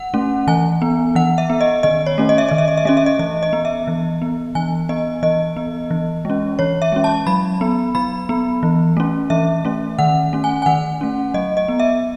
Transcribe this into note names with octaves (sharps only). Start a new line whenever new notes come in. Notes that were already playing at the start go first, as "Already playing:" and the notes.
Already playing: F#5
A3 C#4
E3 G#5
B3
E3 F#5
E5
B3
D#5
D#3 D#5
C#5
A3 C#4
D#5
E5
D#3 D#5
E5
D#5
E5
A3 C#4 D#5
E5
D#5
E3 D#5
D#5
B3
E5
E3
B3
E3 G#5
B3 D#5
E3 D#5
B3
E3
G#3 C#4
E3 C#5
E5
G#3 C#4
A5
F#3 B5
B3
F#3 B5
B3
E3
A3 C#4
E3 E5
A3 C#4
D#3 F#5
A3 C#4
G#5
G#5
D#3 F#5
A3 C#4
F#3 D#5
D#5
B3
E5